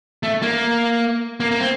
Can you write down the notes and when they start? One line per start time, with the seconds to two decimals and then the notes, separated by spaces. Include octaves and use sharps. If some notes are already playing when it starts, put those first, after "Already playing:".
0.23 A3
0.42 A#3
1.40 A#3
1.51 A#3
1.60 C4